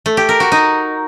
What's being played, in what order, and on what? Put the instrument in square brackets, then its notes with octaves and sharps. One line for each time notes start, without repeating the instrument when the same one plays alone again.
[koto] A3
G4
A#4
F#4
D#4